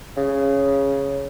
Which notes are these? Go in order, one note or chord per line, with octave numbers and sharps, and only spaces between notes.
C#3